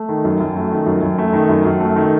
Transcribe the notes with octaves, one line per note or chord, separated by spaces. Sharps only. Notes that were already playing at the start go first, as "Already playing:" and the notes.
Already playing: A3
D#3
F#2
F#2
A3
D#3
F#2
F#2
A3
D#3
F#2
F#2
A3
D#3